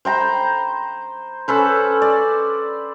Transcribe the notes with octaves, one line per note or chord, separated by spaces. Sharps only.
C5 G5 A#5 B5
C#4 A4 B4 C5
D5